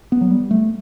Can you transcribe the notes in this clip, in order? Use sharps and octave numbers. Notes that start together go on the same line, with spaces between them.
B3
F#3
G3
A3